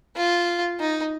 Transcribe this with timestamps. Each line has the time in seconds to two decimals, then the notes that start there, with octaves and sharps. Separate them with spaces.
0.16 F4
0.80 D#4